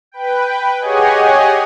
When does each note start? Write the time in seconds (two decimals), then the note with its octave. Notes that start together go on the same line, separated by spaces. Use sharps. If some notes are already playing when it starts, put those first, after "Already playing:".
0.12 B4 G5
0.79 G4 G#4 C#5 D#5 F#5 G#5